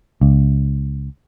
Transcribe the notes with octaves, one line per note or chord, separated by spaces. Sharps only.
C#2